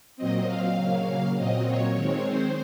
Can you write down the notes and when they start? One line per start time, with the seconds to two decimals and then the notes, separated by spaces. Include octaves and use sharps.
0.17 A#2 F#3 C4 D#5
0.46 F5
0.77 C#3 F#3 A#3
1.37 A#2 F#3 C4 D#5
1.66 C#5
1.95 D#3 G#3 C4
2.26 C5